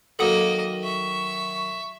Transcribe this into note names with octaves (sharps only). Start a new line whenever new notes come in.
D#3 F#3 A#3 A4 D#5 F#5 D#6
E5 C#6